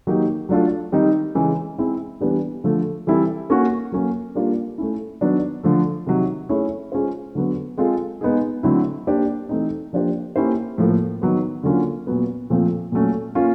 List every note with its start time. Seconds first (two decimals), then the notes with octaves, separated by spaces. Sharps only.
0.07 D#3 F#3 A#3 D#4 G4
0.49 F#3 A3 D4 F4 A4
0.92 D#3 G3 C4 D#4
1.35 C#3 E3 G#3 C#4
1.78 G#3 C4 E4
2.21 E3 G3 B3 D4 G4
2.64 D3 F3 A3
3.07 E3 G3 C4 E4 A4
3.50 A#3 C#4 F#4
3.92 F#3 A#3 C#4
4.35 G3 A#3 D4 F4
4.78 A3 C#4 E4
5.21 D#3 F#3 B3 D4
5.63 D3 F3 A3
6.06 C3 D#3 F#3
6.49 A3 C#4 E4 G#4 C#5
6.92 G#3 C#4 F4 G#4 C5
7.35 D3 F#3 B3
7.77 G#3 C4 F4 A4
8.21 G#3 B3 D#4 G#4
8.63 D3 F#3 A3 C4 E4
9.07 A#3 D4 G4 C5
9.49 E3 A3 C4 D#4
9.93 F3 A#3 D4 G4 C5
10.36 A#3 C#4 E4 G4 C5
10.78 A2 F3 A#3
11.22 D#3 F#3 B3
11.63 D3 F#3 A#3 C#4 F4
12.07 A#2 F#3 B3
12.50 A#2 F3 A3 C4 F4
12.92 A#2 F#3 A3 C#4
13.35 A#3 C#4 F4